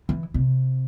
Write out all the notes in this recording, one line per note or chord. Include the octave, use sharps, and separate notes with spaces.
E3
C3